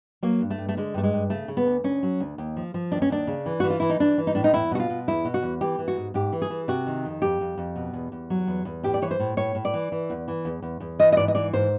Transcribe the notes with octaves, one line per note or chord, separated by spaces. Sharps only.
F#3 A#3
G2
A3
G2
A3
D3 G#3
G2 A3
G#3
G2
C#3 A3
C#3
B3
D2
D2 C#4
F#3
D2
D#2
F3
F3
D#2 D4
C#4
D#2 D4
C#3
E3
E3 F#4
F4
E3 E4
D#4
E3 D4
E3
D#4
A2 D4
D#4
E2 E4
B2 F#4
F4
B2
E2 E4
B2
F#4
E2
E3 G4
E3
F#4
G#2
G#2 G4
E3
G#4
E3
C3 F#4
D#3
F2
F2 G4
F2
F2
B2
E2
E2
F#3
E2
E2
A2 G4
D5
E3 C#5
C5
A2
A2 C#5
A2
D5
E3
E3
E2
E3
E2
E2
E2
E3 D#5
D#5
G#2 D5
D#5
E3 D5
G#2 C5